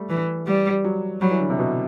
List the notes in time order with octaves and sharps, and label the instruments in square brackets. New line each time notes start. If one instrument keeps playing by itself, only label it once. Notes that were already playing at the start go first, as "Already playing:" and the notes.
Already playing: [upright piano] G3 A3
[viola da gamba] E3
G3
[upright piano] F#3
[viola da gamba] F#3 [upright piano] G3
[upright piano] E3
D3
C3
B2